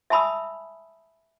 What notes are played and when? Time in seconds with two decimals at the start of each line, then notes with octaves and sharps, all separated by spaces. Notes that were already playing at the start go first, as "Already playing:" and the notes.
0.10 E5 G#5 A5 B5 D#6 E6